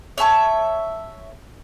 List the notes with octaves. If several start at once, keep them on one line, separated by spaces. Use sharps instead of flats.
C#5 E5 A5 C#6